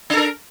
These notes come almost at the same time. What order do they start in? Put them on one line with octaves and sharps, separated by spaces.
D4 A4 A#4